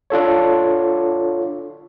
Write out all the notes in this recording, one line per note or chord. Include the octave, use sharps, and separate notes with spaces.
D4 F4 A4 C#5